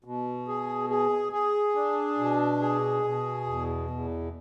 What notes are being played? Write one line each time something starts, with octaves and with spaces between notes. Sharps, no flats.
B2
G#4
G#4
G#4
D4
B2
G#4
B2
E2
E2